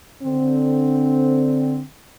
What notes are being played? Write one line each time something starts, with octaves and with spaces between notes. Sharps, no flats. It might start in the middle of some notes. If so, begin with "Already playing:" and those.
D3 C4